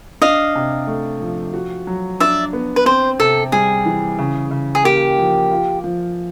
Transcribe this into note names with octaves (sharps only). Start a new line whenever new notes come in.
D4 D#5 F5
C3
A3
F3
F#4
F#3
D4 D5 E5
B3
B4
C4 C5
C3 A4
G3 G#4
E3
C#3
C#3
G#4
A#3 G4
F3
F4
F3